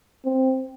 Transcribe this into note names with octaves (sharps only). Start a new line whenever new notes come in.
C4